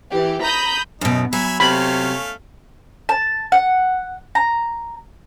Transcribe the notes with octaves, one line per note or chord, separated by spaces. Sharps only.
E3 G4
A#5 B5 D#6 G6
F#2 B2 D#4
F#3 E5 G#5 B5
C3 A3 C#4 F5 B5
A5
F#5
A#5